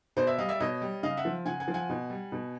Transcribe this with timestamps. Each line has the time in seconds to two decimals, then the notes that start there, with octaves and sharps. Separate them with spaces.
0.16 B2 C5 D5
0.27 D5 E5
0.38 G3 D#5 F5
0.49 D5 E5
0.60 B2 C#5 D#5
0.82 G3
1.03 C#3 D#5 F5
1.17 E5 F#5
1.25 F3
1.46 C#3 F#5 G#5
1.60 F#5 G#5
1.68 F3
1.74 F#5 G#5
1.89 B2
2.10 G3
2.32 B2